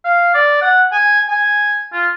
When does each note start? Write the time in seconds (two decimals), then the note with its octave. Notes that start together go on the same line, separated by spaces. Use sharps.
0.05 F5
0.34 D5
0.62 F#5
0.92 G#5
1.28 G#5
1.93 F4